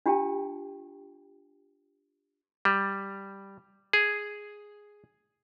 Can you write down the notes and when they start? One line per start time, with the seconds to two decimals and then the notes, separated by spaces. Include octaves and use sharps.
0.06 D4 F4 G4 G5 A5
2.65 G3
3.93 G#4